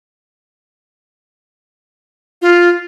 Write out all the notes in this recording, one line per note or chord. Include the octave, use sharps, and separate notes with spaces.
F4